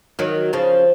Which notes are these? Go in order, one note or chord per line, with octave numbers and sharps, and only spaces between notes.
D#3 F#3
C#3 F3